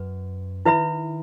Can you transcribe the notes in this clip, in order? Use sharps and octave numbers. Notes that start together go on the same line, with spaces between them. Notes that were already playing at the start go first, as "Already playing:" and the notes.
Already playing: F#2 B4
D#3 E4 B4 E5 B5